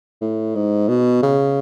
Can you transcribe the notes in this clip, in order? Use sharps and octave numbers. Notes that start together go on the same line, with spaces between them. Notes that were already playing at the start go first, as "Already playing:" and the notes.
A2
G#2
B2
C#3